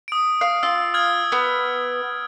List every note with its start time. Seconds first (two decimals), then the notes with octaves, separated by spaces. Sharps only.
0.08 D#6 D7
0.41 F5
0.63 F4 E6
0.94 D#6 F6 G#6
1.32 B3